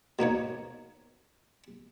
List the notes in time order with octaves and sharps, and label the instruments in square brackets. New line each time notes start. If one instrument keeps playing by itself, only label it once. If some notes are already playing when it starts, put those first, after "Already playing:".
[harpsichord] B2 A#3 D#4 C#5